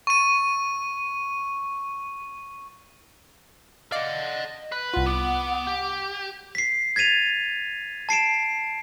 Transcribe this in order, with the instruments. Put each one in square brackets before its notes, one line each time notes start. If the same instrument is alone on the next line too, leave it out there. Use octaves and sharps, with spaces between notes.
[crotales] C#6 D#7
[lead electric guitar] D5 F#5 [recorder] D#5 [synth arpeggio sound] F5 D6
[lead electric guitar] B4
[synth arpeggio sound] C2 F4 [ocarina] F#5
[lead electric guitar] B3 [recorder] D6
[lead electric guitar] G4
[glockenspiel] B6 C7
G#6 A6 B6 D#7 F7
A5 C7 D7 E7